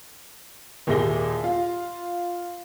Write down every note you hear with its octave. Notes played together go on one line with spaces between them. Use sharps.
D#2 A#2 E4 G#4 A#6 G7
F4